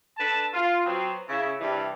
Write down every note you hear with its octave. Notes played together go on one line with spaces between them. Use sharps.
D4 A4 B4 A5
F4
F#3 B3 C4
C#3 E4
G2 C3 E3 G3